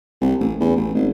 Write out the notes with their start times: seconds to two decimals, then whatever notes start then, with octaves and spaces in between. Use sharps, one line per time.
0.21 C2
0.40 A1
0.60 E2
0.76 A1
0.94 G#1